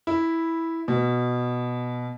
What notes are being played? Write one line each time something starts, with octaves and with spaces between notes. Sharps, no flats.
E4
B2